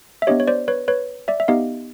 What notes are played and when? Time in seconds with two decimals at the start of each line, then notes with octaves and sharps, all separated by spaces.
0.22 E5
0.27 B3 D4 G4 C#5 D#5
0.40 C#5
0.47 C5 D5
0.68 B4 C#5
0.88 B4 C#5
1.28 D5 E5
1.40 E5
1.48 B3 D#4 G4 D#5 F5